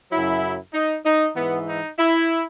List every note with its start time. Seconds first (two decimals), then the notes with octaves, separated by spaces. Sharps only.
0.12 F#2 C#3 F#3 E4
0.74 D#4
1.06 D#4
1.36 G#2 E3 B3
1.68 D#4
1.99 E4